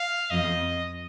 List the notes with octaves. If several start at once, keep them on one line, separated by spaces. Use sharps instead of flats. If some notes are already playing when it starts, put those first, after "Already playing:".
Already playing: F5
F2 F3 D#5